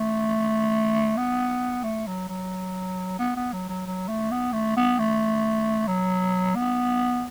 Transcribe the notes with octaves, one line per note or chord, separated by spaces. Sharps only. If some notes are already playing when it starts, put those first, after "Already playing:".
Already playing: A3
B3
A3
F#3
F#3
B3
B3
F#3
F#3
F#3
A3
B3
A3
B3
A3
F#3
B3